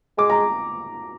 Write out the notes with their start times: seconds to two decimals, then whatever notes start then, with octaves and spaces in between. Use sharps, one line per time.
0.18 G#3 D6
0.30 A#5